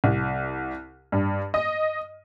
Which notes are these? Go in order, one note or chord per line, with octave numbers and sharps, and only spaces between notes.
C2
G2
D#5